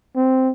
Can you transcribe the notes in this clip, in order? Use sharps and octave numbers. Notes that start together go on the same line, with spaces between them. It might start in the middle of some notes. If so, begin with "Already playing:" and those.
C4